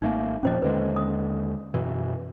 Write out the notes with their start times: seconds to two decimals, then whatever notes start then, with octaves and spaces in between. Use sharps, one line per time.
0.02 G#1 A3 A#3 D#4
0.43 E1 A#2 F3 C#4 C5 D#5
0.62 D#2 D3 G#3 B4
0.96 D#6
1.74 F#2 B2 E3